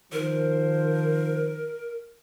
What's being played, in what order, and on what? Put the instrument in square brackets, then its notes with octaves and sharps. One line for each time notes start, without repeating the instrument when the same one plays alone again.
[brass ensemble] D#3 F3 C5 [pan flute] A#4